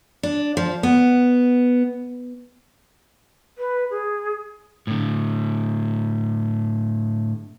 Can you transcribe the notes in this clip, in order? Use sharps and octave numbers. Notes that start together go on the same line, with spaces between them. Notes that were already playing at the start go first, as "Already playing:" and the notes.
D4
F3
B3
B4
G#4
A2 D3